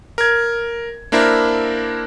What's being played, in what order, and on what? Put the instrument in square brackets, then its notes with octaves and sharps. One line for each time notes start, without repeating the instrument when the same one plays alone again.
[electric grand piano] A#4 G#6
A#3 D4 E4 A#4 C5